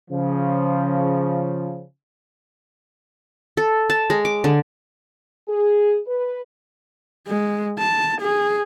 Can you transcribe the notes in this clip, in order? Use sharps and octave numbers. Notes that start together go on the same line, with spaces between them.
C#3 F3
A4
A5
G#3
D6
D3
G#4
B4
G#3
A5
G#4